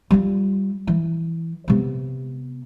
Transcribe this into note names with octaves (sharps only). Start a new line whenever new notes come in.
G3 F4
E3
C3 B3